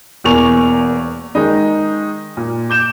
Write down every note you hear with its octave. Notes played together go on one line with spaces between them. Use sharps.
E1 E2 A#3 G#5 C#6 F7
D#3 G#3 D#4
A#2
D6 G6 E7